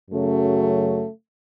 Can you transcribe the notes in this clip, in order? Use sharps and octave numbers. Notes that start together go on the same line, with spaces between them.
F#2 C#3 F#3 A3